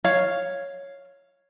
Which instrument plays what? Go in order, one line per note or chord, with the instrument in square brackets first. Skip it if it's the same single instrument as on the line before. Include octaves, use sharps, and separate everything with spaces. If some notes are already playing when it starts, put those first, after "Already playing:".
[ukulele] C#5 F5